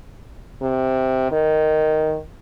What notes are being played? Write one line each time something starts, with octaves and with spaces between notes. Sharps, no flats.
C3
D#3